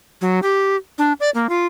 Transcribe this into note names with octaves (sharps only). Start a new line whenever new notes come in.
F#3
G4
D4
D5
A#3
F4